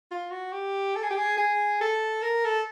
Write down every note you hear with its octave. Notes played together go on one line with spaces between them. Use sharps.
F4
F#4
G4
A4
G#4
G4
G#4
G#4
A4
A#4
A4